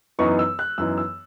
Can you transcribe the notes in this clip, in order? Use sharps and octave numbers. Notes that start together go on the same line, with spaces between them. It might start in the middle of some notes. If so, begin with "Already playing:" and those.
F#2 E3 B3 D#4 C#6
E6
F#6
F#2 E3 B3 D#4 E6
E6